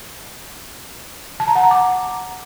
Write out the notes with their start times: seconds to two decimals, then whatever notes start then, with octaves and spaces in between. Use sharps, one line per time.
1.40 A5
1.48 A#5
1.55 F#5
1.63 A#5
1.71 D6